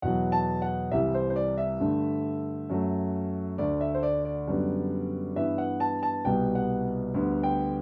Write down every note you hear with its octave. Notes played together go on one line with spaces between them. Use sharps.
E2 B2 F#3 F#5
A5
F#5
C2 C3 E3 G3 E5
C5
C5
D5
E5
G2 D3 A3
F#2 F#3 A3
D2 D3 A3 D5
E5
C5
D5
D5
F#2 D3 G3 B3
G2 E3 B3 E5
F#5
A5
A5
C2 B2 G3 B3 G5
F#5
D2 D3 G3 B3
G5